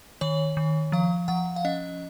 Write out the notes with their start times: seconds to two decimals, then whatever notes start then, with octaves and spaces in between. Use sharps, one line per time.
0.21 D#3 C#5
0.57 D#3
0.92 F3 F5
1.28 F3 F#5
1.56 F5
1.65 C#4 D#5